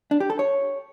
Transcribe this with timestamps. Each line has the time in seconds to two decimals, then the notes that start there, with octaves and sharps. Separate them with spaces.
0.11 D4
0.20 G4
0.30 A4
0.39 C#5